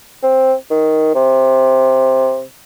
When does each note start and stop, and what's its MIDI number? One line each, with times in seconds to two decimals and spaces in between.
0.23 0.53 60
0.70 1.12 51
1.15 2.43 48